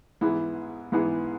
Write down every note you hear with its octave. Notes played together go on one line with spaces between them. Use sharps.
G#2 E3 B3 E4 G#4
G#2 E3 B3 E4 G#4